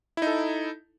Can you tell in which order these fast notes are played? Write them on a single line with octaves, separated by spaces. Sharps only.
E4 D#4 A4